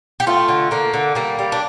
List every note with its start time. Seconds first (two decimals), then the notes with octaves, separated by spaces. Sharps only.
0.20 G4
0.27 A3 F4
0.48 D3
0.71 D3 A#3
0.94 D3
1.15 G3 A#3
1.39 G3
1.52 D4